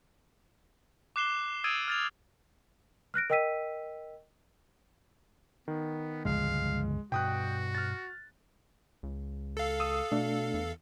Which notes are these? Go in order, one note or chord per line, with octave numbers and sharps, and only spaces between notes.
D6 F#6 C7 E7 G7
D#6 E6 G#6 A6 D7 D#7
F6 A6 F7
F6 F#6 A#6 D7
A#4 D#5 G5 E6 B6 D#7
D#3 B3
G1 C#2 F3 G#3 F5
G2 B2 F#4 G5 D#6 F#6
F6 A6
C#2
A4 F5
D#6 E6
B2 A3 D4
E2